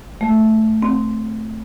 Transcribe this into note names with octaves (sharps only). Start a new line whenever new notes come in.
A3
C4